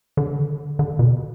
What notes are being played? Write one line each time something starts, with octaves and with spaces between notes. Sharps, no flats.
D3
D3
B2